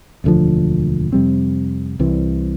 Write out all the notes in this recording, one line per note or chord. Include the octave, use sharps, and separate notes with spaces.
E1 D2 D3 F3
F2 C3 G3 C4
C2 C3 E3